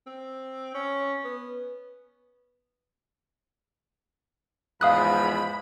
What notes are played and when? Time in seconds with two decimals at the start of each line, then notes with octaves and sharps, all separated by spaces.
0.07 C4
0.74 C#4
1.24 B3
4.81 E2 G#2 F3 F5 B5 D#6 F#6